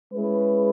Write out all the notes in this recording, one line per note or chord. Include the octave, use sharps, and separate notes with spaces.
G#3 C#4 E4 G#4 B4